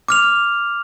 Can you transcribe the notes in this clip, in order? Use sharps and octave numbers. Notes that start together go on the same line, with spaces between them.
D6 F6 F7